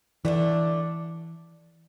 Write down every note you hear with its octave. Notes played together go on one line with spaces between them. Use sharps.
D3 E3 A3 D4